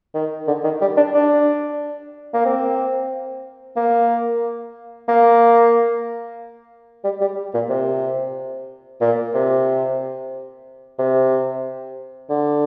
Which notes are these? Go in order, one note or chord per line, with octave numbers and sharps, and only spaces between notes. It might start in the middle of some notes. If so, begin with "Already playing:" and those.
D#3
D3
D#3
G3
D4
D4
A#3
C4
A#3
A#3
G3
G3
A#2
C3
A#2
C3
C3
D3